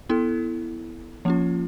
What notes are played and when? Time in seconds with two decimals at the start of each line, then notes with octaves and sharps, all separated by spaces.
0.09 B3 E4 A4
1.25 F3 A#3 C#4 F4